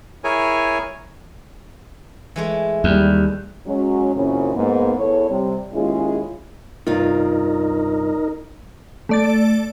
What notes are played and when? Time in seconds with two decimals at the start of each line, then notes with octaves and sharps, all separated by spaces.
0.24 E4 G#4 A#4 C#5 G#5
2.36 E3 G#3 A3
2.84 D#2 G3
3.66 F#3 G#3 C#4
4.15 F#2 A#2 C#3 C4 C#4 E4
4.55 G#2 A#3 B3
4.98 E2 E3 A4 C#5
5.29 C3 G3
5.73 D#2 G#3 C#4 E4 F4 G#4
6.87 G2 C3 D#4 F4 A#4
9.09 A3 D5 A6